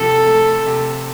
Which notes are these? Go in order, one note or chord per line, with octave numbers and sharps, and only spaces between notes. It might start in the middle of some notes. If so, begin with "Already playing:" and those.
Already playing: C3 F3 A4
A3
C3